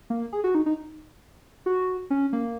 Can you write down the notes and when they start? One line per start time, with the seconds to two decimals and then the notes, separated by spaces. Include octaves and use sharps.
0.10 A#3
0.33 G#4
0.44 F#4
0.55 D#4
0.66 D#4
1.66 F#4
2.10 C#4
2.33 A#3